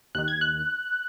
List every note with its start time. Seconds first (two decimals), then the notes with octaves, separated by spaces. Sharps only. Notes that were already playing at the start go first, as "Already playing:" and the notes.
0.15 D#2 D#3 F#6
0.28 G#6
0.41 F#6